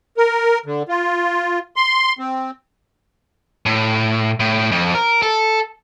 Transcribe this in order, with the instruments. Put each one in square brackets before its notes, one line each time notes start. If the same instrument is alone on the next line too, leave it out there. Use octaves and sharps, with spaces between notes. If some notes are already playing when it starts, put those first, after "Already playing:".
[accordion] A#4
D3
F4
C6
C4
[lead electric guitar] A2
A2
F2
A#4
A4